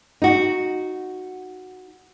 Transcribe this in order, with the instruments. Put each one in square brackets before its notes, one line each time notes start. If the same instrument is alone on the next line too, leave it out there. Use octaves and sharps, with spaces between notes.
[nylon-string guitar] D#4 F#4